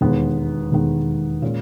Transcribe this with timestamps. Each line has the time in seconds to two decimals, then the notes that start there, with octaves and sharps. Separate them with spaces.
0.01 E1 D#2 D#3 G#3 B3
0.72 E1 D#2 D#3 G#3 B3
1.42 A#2 G#3 C#4